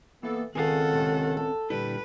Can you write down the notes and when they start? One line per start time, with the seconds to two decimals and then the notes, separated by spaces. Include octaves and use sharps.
0.23 E3 A#3 B3 A4
0.55 C#2 D#3 C4 C#4 G#4 A4 F5 F#5
0.93 C3 G#3
1.37 A4
1.70 A#2 D3 G3 E4 B4